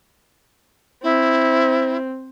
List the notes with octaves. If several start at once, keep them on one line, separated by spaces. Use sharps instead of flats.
C4 E4